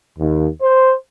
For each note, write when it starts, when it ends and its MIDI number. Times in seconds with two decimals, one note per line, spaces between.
0.19 0.47 39
0.62 0.95 72